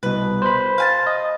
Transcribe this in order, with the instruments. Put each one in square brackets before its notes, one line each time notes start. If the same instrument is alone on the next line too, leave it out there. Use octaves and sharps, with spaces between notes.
[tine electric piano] C2 B2 [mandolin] B4
[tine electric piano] C5 B5
[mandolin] F5 G#5 A5
[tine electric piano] D#5